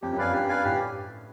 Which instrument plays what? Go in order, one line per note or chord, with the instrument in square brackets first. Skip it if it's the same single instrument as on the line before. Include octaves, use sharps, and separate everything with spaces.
[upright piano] F2 [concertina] G4
[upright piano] F#2
[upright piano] F2 [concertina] B4 D5 F5 G#5
[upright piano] G2 [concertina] G4
[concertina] B4 D5 F5 G#5
[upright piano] A2 [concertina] G4